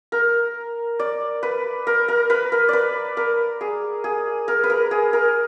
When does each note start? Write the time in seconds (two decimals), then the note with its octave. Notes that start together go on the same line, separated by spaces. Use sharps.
0.12 A#4
0.99 D5
1.43 B4
1.87 A#4
2.08 A#4
2.30 B4
2.52 A#4
2.69 B4 D5
3.17 A#4
3.61 G#4
4.04 G#4
4.48 A#4
4.64 B4
4.70 A#4
4.91 G#4
5.13 A#4